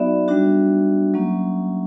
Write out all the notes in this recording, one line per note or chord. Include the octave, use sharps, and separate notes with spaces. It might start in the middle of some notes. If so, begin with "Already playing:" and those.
Already playing: F#3 B3 D#4 F#4 D5 E5
G3 B3 D4 F#4
F#3 A#3 C#4